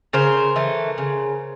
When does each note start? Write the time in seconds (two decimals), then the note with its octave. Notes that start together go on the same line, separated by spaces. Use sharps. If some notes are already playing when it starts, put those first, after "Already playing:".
0.13 C#3 A#4 C5
0.56 E3 A3
0.98 C#3